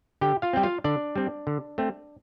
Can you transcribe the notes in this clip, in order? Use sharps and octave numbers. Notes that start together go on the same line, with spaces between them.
D3 G4 G5
F4 F5
G3 C4 G5
F4 F5
D3 D4 D5
G3 C4
D3
A3 C4